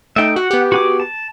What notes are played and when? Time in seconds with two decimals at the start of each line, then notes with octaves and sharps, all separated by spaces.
0.16 A3 D#4 E5 G5
0.36 F#4 F#5
0.51 B3 G4
0.72 F#4 G#4 D6
1.00 A5